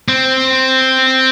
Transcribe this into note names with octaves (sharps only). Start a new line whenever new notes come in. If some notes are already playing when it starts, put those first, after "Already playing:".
C4